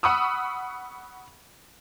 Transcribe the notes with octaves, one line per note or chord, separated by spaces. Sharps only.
F#5 B5 C#6 D#6 E6